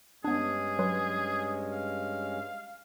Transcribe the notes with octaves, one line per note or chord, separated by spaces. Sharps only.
G2 G#3 B3 C#4 D4 G#4
F#3 B4 C6
F5